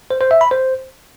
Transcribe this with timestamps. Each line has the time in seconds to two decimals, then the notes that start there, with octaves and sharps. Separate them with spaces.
0.11 C5
0.21 C5
0.31 E5
0.41 B5
0.51 C5